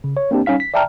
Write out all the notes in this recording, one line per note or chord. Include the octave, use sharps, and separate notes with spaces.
C#3
C#5
A#3 C4 D4 G4
G3 C#4 D#4 F5 B6
B6
D5 E5 G5 A5 A#5 F6